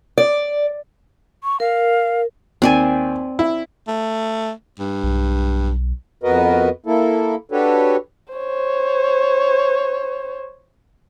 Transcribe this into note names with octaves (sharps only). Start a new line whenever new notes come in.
D5
C#6
A#4 F5
D#2 C4 D5 G#5
E4
A3
G2
B1
F2 B3 F#4 A#4 B4 D#5
A#3 E4 A4
D4 F#4 G4 A4 B4 C#5
C5 C#5